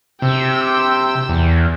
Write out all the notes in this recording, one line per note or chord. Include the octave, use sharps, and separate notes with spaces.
C3 G5 E6
E2